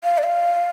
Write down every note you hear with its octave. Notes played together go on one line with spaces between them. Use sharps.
F5
D5
F5